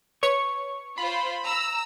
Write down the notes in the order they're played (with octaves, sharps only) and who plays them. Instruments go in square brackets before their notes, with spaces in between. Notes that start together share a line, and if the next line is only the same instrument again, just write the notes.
[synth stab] B4 C#5 C#7 [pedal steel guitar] C#6
[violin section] F4 C5 [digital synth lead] B5
[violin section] A#5 E6